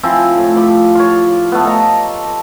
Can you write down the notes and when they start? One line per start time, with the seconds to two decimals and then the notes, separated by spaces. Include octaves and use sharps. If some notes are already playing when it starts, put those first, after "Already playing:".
0.03 F3 C4 E4 G#5
0.37 A2
0.56 F3 G4 B5
0.95 F4 C#5
1.52 A3 B3
1.65 A4 D#5 A5 A#5